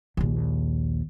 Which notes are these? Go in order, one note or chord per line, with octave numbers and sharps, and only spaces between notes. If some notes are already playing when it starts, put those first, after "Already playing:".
A#1 D#2